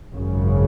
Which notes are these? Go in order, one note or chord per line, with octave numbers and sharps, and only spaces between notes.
G#1 F#2 C#3